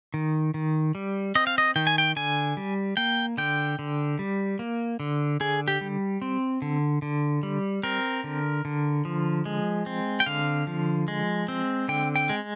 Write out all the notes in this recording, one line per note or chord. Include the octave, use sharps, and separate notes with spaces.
D#3
D#3
G3
C4 D#5
F5
D#5
D#3 G5
G#5
G5
D3 G#5
G3
A#3 G5
D3 G5
D3
G3
A#3
D3
D3 G#4
G4
G3
C4
D3
D3
G3
C4 A#4
D3
D3
F3
G#3
C4
G5
D3 F5
F3
G#3
C4
D3 G5
G5
G#3